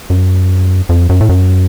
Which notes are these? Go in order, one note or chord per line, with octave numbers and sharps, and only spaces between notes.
F#2
F2
F#2
A2
F#2